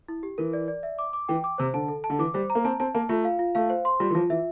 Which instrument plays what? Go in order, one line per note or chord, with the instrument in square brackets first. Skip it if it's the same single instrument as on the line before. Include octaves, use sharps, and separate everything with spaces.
[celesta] E4
G4
[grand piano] E3 [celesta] A#4
[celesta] D5
D5
E5
D6
D6
[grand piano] E3 [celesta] G5
[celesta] D6
[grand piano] C3 [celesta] C5
[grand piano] D3 [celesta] A5
[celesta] A4
A5
[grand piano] D3
[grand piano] E3 [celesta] D6
[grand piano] G3 [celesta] C5
[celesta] A#5
[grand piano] A#3
[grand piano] C4 [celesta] A5
[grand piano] C4 [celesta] A5
[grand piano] A#3 [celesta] A5
[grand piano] A3 [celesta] F4
[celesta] F5
F4
[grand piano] A3 [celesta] F5
[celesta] C5
C6
[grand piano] G3 [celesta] F4
[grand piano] E3
[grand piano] F3 [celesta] F4
[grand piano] E3 [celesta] E5